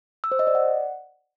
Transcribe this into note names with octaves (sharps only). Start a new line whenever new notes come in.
E6
C5
D#5
D5
F#5